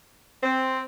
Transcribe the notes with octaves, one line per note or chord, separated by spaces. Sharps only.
C4